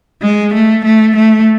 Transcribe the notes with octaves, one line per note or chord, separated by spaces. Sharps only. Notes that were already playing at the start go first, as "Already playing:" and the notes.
G#3
A3
A3
A3